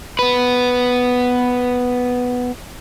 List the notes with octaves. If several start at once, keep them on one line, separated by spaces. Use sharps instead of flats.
B3 B4